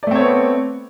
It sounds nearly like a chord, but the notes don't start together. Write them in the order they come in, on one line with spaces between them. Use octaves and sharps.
D5 A3 C4 C#5 B3